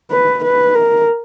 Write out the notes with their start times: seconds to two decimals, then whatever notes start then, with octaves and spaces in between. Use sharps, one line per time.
0.11 B4
0.44 B4
0.75 A#4